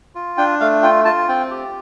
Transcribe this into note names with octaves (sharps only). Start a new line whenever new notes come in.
F4
D4 G5
A3 F5
F4 G5
F4 A5
C4 G5
G4